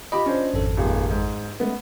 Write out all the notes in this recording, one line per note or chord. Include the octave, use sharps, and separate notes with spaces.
F4 G4 D#5 B5
C#4 D4 C5
G#1 F2 A4
D#1 D#2 G#3
G#2
G#3 A3 B3 C#4